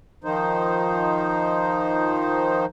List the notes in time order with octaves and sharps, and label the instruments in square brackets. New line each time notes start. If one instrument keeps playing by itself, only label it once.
[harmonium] D#3 F3 D#4 C5